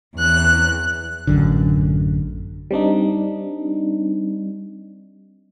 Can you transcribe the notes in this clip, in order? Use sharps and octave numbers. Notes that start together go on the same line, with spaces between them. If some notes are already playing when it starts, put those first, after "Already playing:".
E2 F#6
A1 F#2 D3
G3 C4 D4 D#4